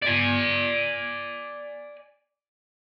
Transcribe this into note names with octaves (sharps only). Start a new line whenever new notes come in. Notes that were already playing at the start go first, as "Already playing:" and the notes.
D5 G#5